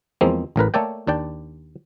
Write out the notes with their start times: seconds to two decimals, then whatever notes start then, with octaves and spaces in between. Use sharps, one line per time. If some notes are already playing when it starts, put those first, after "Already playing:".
0.21 E2 F3 G#3 A#3 C4
0.56 A1 A2 A#4 B4
0.74 A3 A#3 A4 C#5 D5 G5
1.07 D#2 D4 D5 G5